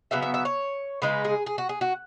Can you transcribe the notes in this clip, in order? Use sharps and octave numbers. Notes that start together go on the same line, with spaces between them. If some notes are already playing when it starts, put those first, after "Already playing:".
C#3 F#3 B3 E5
E5
E5
C#5
C#3 G#3 D#4 B4
G#4
G#4
F#4
G#4
F#4